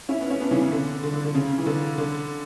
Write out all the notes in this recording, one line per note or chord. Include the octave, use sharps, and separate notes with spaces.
C#4 E4
B3
C#4
B3 D4
C#3 E3
C#3
D3
D3
D3
D3
C#3
E3
D3
D3